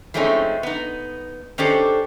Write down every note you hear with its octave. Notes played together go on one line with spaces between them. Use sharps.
F3 G#3 A3 C4 C#4 D#4
B3 D#4
D#3 C#4 D4 G4 A4 C5